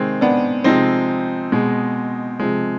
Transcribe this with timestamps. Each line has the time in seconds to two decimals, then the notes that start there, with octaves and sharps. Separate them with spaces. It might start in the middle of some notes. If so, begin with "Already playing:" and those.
Already playing: C3 D#3 G#3 C4
0.21 B3 D4
0.64 C3 F3 G#3 C4 D#4
1.52 B2 G#3
2.39 C3 F3 G#3